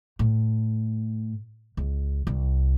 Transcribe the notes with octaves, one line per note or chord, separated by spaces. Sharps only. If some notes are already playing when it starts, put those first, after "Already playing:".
A2
C#2
C2